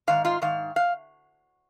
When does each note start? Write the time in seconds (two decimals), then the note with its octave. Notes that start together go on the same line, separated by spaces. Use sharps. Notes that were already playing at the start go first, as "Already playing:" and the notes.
0.07 G#2 D#3 F5
0.25 F4 F5
0.42 G#2 D#3 F5
0.76 F5